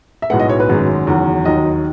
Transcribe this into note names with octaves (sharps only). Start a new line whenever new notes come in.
E5
B1 A2 G#3 B3 F#5
D#5
C#5
B4
G#1 F#2 D#3 G#3
F#1 E2 D#3 F#3
D#2 D#3 F#3 D#5